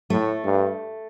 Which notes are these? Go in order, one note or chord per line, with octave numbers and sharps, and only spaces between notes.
A2 A3
G2